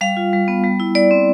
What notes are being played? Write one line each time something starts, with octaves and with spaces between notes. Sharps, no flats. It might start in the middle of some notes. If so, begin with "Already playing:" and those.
G3 F5
F4
G3
B3
G3
E4
G3 D5
C4